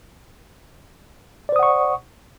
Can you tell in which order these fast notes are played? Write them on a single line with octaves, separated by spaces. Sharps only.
D5 C5 D#6 F#5 C#6